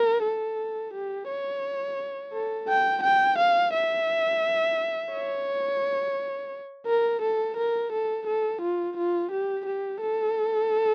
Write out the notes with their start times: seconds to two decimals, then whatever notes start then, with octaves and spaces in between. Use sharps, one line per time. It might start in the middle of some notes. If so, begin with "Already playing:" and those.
Already playing: A#4
0.24 A4
0.94 G4
1.29 C#5
2.33 A4
2.69 G5
3.03 G5
3.39 F5
3.74 E5
5.13 C#5
6.87 A#4
7.22 A4
7.57 A#4
7.92 A4
8.27 A4
8.62 F4
8.97 F4
9.32 G4
9.66 G4
10.02 A4